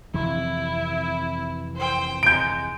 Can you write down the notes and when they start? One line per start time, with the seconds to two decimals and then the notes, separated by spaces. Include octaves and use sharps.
0.14 F2 C3 E3 E4
1.76 C5 G5
2.23 G#3 G6 D7